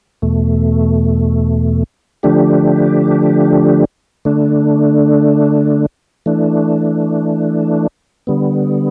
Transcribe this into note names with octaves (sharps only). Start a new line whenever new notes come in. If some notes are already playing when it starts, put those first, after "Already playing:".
E2 B2 A3
D3 F3 A3 D4 G4
D3 A3 D4
E3 A3 D4
D3 G3 B3